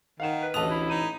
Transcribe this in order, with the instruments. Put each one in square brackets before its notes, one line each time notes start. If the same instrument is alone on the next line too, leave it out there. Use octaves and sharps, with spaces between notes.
[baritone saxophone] D#3 [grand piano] F5 F#5 E7
[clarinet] B4
[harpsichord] A1 D#6 [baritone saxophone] D2 [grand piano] D#5 A5 F7
[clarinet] E4
[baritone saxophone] D#4 [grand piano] D#7